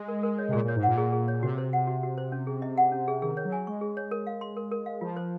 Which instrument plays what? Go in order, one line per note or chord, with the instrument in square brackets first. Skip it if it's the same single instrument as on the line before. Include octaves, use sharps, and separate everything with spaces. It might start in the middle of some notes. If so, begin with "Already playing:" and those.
Already playing: [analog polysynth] G#3
[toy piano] A#4
A#4
C#5
[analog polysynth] C3
[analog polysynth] A#2 [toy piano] G#4
[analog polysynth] A#2 [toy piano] C#5
[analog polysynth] G#2
[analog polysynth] A#2 [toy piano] F#5
[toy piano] G#4
G#4
C#5
[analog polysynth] C3 [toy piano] F#4
[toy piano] C5
F#5
F#4
F#4
C5
C#4
G#4
D#5
F#5
C#4
G#4
[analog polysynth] D#3 [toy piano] G#4
[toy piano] C#5
[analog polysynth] F#3
[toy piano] G#5
[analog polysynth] G#3 [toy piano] C#6
[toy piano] G#4
C#5
A#4
F5
C6
A#4
A#4
F5
[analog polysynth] F3 [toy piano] F4
[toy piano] C5